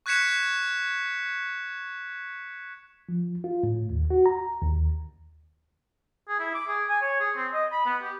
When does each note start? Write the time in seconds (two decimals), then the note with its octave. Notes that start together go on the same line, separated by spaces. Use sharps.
0.06 C#6 F#6 G#6 B6 C#7 E7
3.09 F3
3.44 F4
3.63 A2
3.90 D#2
4.10 F#4
4.26 A#5
4.62 D#2
6.28 G#4
6.40 E4
6.54 D6
6.68 G#4
6.89 G#5
7.02 C#5
7.20 G#4
7.37 C4
7.54 D#5
7.72 B5
7.86 B3
8.02 G4